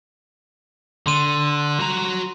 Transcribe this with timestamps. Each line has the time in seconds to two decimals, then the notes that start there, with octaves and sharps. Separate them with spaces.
1.07 D3 C6 D#7
1.80 F#4 A#5